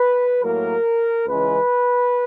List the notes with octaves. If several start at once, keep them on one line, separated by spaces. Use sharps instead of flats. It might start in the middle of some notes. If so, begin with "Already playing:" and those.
Already playing: B4
A2 F#3 A#3 A#4
C#2 C#3 E3 G#3 B4